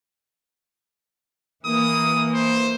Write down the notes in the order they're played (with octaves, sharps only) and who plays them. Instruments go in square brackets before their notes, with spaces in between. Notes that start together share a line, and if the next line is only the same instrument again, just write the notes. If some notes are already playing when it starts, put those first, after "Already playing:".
[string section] E3 A#3 [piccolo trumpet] D#6
[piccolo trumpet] C5